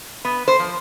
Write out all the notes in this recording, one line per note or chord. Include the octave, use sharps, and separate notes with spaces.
B3
C5
F3